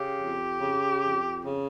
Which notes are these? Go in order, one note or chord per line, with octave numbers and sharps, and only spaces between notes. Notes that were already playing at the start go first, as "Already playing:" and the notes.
Already playing: C#3 G4
F2
C#3
F2
C#3